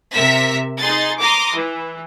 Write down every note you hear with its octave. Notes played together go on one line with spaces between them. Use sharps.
C3 A#4 E5 B6
D#4 G#4 C6 A6
A#5 C6 D6 D#6 A#6
E3